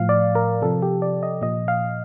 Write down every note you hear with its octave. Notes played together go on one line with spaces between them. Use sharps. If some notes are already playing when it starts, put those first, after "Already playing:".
Already playing: A2 F3 F5
D5
A#4
C3 F3 A4
G4
D5
D#5
A#2 F3 D#5
F5